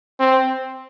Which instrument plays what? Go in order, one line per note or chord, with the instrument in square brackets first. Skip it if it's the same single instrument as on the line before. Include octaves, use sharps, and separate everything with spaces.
[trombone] C4